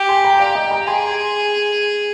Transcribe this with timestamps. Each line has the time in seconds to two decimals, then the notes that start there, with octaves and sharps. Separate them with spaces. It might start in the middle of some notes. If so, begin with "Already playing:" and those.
Already playing: G4
0.09 G#5 C6
0.25 G5 A#5
0.39 G4 D5 F5
0.55 D#5 G5
0.71 G5 A#5
0.87 G#4 G#5 C6